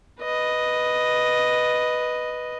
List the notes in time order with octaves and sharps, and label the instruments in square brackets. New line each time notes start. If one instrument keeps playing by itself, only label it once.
[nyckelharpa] B4 D#5